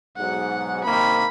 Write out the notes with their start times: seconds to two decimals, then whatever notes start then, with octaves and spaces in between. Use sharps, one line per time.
0.17 B1 G#2 F#5
0.84 C3 D#3 A#3 B5